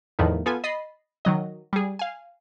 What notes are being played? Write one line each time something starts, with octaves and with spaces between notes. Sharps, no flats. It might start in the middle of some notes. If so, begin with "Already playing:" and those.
E2 A2 D#3 F3 A3
B3 F4 A4 G#5
D#5 B5 A6 C7
D#3 F#3 D#5
G3 G#4
F5 G#5